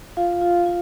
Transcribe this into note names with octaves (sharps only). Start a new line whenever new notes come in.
F4 F5
F4
F4